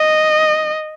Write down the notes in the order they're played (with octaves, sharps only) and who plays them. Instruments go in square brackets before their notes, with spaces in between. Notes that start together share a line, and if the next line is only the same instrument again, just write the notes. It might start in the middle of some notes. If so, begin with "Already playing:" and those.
Already playing: [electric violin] D#5